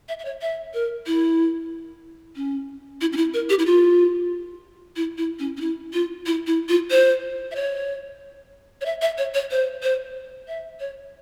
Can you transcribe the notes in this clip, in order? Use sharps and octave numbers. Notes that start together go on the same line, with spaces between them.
E5
E5
C#5
E5
A#4
E4
C#4
E4
C#4
E4
A#4
G4
E4
F4
E4
E4
C#4
C#4
E4
F4
E4
E4
F4
C5
E5
C#5
C#5
E5
E5
C#5
C#5
C5
C5
E5
C#5